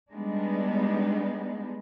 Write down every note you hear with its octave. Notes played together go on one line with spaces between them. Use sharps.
G3 G#3 B3 D4 D#4